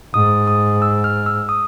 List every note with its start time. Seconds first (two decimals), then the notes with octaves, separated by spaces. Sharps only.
0.14 G#2 D#6
0.47 D#6
0.82 E6
1.04 F6
1.26 E6
1.49 D#6